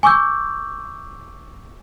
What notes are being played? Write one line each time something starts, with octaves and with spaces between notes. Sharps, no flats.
G#5 C#6 D6 E6 G6